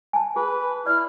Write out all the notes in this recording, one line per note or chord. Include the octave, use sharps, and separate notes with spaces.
G#5 A5
G#4 B4
E4 D5 F6